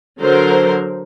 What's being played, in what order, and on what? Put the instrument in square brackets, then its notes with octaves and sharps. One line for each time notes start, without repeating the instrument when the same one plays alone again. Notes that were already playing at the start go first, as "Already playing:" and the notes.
[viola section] D3 F#3 A#4 C5